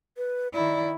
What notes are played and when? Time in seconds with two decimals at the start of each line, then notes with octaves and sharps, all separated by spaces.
0.17 B4
0.54 D#3 E4 D5